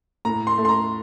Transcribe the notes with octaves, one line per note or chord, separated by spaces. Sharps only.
A2 A#5
C6
A3
C6
A#5